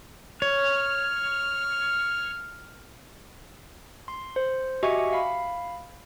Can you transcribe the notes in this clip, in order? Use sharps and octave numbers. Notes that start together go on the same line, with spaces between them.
C#5 F6
C6
C5
F#4 G4 D#5 E5 G#5 C#6
F5 B5